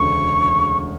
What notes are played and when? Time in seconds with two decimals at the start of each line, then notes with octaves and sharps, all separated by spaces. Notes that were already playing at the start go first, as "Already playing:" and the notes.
Already playing: E1 D2 C#3 C#6